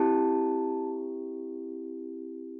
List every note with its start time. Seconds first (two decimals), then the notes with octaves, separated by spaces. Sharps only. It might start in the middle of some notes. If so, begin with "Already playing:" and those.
Already playing: C4 E4 G4 A5